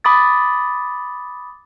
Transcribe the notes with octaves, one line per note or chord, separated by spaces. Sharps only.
B5 D6 D#6 A6